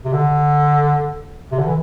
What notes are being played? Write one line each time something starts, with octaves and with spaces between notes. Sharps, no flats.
C3
D3
C3
D3
E3